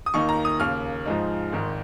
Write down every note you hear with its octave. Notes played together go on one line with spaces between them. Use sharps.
D#6
D#2 D#3 A#3 D#4 C#6
A#5
D#6
D#2 C#3 A#3 F6
G#2 F3 G#3 D#4
G#1 G#2 D#3